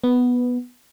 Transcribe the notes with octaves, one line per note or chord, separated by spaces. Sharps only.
B3